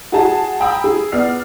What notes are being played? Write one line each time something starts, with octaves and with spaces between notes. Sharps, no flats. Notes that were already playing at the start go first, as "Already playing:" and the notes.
F#4 G#4 A5
G5 G#5 A#5 B5 D#6 E6
G#4
B3 D5 F6 C7